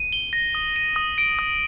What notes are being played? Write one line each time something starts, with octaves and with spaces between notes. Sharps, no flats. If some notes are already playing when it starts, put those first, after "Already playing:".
Already playing: D#7
G7
A#6
D#6
D#7
D#6
D7
D#6